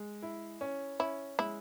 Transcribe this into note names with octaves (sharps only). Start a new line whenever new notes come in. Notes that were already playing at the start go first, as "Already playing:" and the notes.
Already playing: G#3
E4
C#4
C#4 E4
G#3 E4